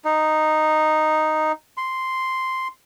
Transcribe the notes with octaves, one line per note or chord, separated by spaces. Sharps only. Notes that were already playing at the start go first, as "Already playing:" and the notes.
D#4
C6